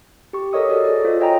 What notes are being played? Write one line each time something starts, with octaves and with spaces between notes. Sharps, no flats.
G4 C#6
A4 A#4 C#5 D#5 D#6
F#4 A4 D5
G#4 D5
F4 C5 D#5
C#5 D#5 G5 G#5 A#5